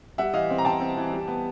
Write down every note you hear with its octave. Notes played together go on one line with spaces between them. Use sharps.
G3 E5 F#5
E3 D#5 F5
C4
A#5
C4 G5 A5
C4
E3
G3
B3